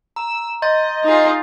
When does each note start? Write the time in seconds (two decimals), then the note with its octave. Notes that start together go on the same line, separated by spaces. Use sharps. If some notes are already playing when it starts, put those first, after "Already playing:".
0.16 A#5 E6
0.62 D#5 C6 G6 A6
1.03 D#4 F4 G#4